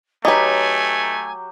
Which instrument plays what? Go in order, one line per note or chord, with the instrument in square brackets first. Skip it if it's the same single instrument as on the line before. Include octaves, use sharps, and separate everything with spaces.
[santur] F#3 G4 C#6 [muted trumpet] A3 [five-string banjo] D#4 B4 [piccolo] G#5